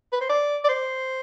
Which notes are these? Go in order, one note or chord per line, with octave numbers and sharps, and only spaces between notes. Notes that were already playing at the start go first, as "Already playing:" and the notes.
B4
C5
D5
D5
C5